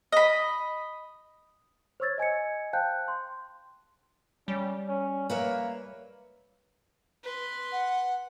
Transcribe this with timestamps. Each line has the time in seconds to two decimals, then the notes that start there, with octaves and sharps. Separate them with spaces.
0.12 D#5 B5
2.00 C5 C#5 C#6 E6 G#6 A6
2.18 D#5 G#5 G#6 C#7
2.73 C5 F5 G5 A5 F#6 G6
3.08 C6
4.48 G3 C#4
4.88 C#4
5.30 A#3 B4 C#5 E5
7.24 B4 C6
7.72 F#5